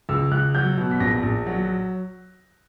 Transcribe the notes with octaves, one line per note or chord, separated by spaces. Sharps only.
C#2 E6
C#2 F#6
F#3 G6
B2
B6
A#1 A#6
A#1
F#3